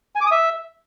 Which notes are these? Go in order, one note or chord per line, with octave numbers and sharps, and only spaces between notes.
G#5
D6
D#6
E5